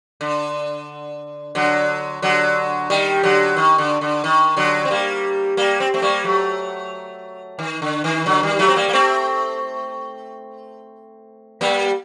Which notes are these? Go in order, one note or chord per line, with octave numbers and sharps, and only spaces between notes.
D3
D3 F#3
D3 F#3
D#3 G3
D3 F#3
D#3
D3
D3
D#3
D3 F#3
C4
G3 A#3
G3 A#3
C4
A3 C4
G3 A#3
F#3 A3
D#3
D3
D#3
D3 F#3
D#3 G3
F#3 A3
C4
G3 A#3
A#3
A3 C4
G3 A#3